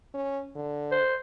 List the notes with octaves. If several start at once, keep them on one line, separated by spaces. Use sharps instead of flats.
C#4
D3
C5